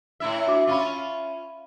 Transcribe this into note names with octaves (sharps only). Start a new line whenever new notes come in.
A2 E4 E5
D4 F#4 D6
C#4 F4 E5 F5 B5